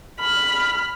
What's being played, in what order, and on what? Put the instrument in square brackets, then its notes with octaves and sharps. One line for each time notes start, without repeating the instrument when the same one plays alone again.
[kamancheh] B5 F6